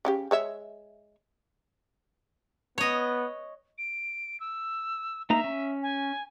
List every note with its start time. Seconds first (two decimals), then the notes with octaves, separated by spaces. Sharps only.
0.05 C#3 C#4 G4
0.31 G#3 C#5 E5
2.78 B3 C#5 D#5
3.78 D7
4.40 E6
5.30 A#3 D#4 E5 A#5
5.44 C#4
5.82 G#5